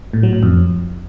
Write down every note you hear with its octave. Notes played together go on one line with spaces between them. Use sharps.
A2
F#3
A2
F2